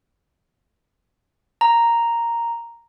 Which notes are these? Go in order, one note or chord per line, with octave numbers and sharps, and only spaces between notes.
A#5